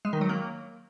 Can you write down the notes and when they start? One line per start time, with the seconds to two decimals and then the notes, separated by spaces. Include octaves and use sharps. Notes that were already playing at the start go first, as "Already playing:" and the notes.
0.05 G#3
0.13 D#3
0.21 F#3
0.29 A#3